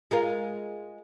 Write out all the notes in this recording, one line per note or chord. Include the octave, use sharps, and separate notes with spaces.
G#3 F4 A#4